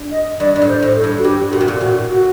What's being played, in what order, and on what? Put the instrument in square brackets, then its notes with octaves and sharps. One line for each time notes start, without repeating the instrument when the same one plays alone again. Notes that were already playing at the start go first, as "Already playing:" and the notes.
Already playing: [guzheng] G2
[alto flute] D#5
[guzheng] G2 [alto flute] D5
[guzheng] G2
A2
[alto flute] C5
[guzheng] A2
[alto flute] A4
[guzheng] G2
[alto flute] F#4
[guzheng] G2 [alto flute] G4
[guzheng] A#2 [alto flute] F#4
[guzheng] C3
A#2
[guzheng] A2 [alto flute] F#4
[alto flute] F#4